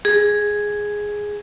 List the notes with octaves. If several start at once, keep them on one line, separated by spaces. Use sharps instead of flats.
G#4